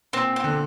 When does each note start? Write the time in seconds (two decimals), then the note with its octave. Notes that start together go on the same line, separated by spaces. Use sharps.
0.13 A#2 C4
0.36 C4
0.44 D3